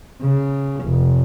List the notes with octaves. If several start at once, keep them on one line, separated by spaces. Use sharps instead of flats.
C#3
F1